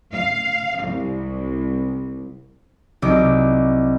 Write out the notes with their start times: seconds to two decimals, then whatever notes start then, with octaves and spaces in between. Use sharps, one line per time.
0.13 F5
0.83 C2
3.02 C2 F#3 D#4 D6